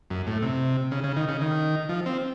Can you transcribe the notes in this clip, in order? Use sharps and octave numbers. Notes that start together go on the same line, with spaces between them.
F#2
A2
C3
C#3
C#3
D#3
C#3
D#3
F3
C4